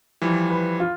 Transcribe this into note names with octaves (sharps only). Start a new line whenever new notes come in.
E3 F3 G3
B4
F4